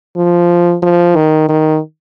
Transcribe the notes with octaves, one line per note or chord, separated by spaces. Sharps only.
F3
F3
D#3
D#3